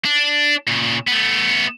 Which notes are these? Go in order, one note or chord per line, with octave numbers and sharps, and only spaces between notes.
D4
A#2 C#3
A3 B3